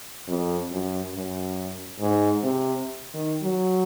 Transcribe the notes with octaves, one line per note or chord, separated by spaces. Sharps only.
F2
F#2
F#2
G#2
C3
D#3
F#3